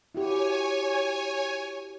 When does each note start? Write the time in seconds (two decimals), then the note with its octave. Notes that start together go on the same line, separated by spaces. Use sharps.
0.15 E4 F#4 G4 C#5 G#5